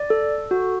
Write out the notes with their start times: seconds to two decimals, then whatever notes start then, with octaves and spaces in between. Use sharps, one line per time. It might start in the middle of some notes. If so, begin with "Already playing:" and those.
Already playing: D5
0.10 A4
0.51 F#4